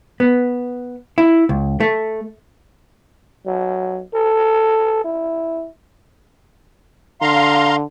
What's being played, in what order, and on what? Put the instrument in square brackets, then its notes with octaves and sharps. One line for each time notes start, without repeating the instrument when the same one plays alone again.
[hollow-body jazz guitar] B3
E4
C#2
A3
[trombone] F#3
A4
E4
[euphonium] D3 [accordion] F5 A#5 C6